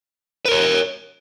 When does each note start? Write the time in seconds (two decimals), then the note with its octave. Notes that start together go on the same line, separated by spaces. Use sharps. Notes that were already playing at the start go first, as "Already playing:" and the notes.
0.45 B4
0.48 A#4
0.51 C#5